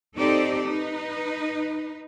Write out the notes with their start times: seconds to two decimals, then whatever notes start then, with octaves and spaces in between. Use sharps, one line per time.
0.18 C4 D#4 G4 A4 C5 D5
0.66 D#4 B4